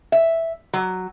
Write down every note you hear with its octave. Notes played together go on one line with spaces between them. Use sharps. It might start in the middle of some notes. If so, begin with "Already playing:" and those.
E5
F#3